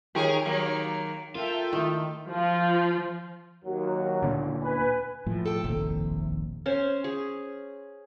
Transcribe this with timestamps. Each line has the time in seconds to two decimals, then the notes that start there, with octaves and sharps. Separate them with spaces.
0.15 D#3 G4 G#4 A#4 C#5
0.45 D#3 F#3 A#3
1.35 F4 A4 A#4 E5 G5
1.73 D#3 A3 E4
2.30 F3 F4
3.65 D#2 F#3
4.23 D2 A#2 D3
4.63 B4 G#5
5.26 A2 F3
5.46 A4 G5
5.64 F1 A#1 D#2 C3
6.66 C#4 C5
7.04 G#4